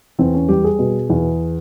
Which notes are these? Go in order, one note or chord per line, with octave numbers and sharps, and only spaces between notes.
E2 C4
C#4
G3 G4
G#4
B2
E2